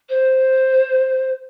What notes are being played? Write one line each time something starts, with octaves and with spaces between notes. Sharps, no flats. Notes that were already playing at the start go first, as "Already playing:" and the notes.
C5